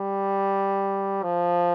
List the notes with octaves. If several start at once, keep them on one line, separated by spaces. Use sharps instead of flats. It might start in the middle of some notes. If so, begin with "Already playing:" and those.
Already playing: G3
F3